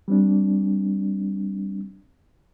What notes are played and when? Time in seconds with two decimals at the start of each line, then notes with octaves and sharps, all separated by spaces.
0.08 G3 C4 D4